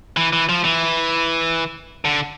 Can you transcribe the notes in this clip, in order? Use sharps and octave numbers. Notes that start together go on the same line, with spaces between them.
E3
E3
F3
E3
D3